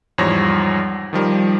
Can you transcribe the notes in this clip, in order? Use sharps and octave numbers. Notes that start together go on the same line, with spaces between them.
E2 G#2 F3 G3 C#5 A#6
D#3 F3 G3 A#4